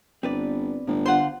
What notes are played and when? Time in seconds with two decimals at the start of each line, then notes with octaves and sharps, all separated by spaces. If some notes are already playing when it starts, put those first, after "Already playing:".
0.23 G1 C4 B4 D5
0.87 G1 A2
1.06 D3 F4 C5 F#5 C6